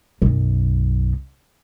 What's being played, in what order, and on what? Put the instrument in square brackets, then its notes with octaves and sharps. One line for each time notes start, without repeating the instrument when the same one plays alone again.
[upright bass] B1 F#2